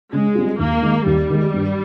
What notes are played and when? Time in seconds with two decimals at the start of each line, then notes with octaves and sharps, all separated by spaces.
0.12 C#3 G#3
0.35 G3 C4 F4
0.59 D#2 A#3
0.82 D#3 G#3
1.06 D#2 G3
1.30 D#3 G#3
1.54 G2